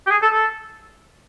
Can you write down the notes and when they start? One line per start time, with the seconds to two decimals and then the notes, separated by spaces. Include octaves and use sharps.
0.07 G4
0.11 G#4
0.22 A4
0.32 A4